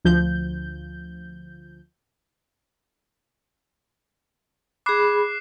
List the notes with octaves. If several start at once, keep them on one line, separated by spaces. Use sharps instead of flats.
D2 F3 G6
G#4 B5 D6 F#6 C7